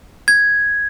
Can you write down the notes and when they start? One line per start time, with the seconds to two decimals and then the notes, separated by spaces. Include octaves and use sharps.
0.28 G#6